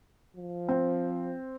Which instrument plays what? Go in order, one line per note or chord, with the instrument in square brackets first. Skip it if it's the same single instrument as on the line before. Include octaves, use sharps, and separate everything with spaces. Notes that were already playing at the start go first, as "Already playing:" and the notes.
[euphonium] F3
[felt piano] C4